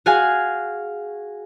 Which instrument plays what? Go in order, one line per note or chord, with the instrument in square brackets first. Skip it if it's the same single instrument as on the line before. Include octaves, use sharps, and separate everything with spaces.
[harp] F#4 G#4 F5 G#5